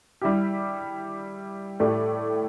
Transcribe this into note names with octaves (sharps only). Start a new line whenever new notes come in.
G3 E4 G4
A2 A3 G4 D5